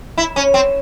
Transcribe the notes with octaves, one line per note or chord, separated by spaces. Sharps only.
E4
C#4
C4